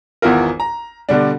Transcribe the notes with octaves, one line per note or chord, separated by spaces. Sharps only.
G#1 E2 B3 E4 F4 A#4
A#5
B2 D3 G3 D4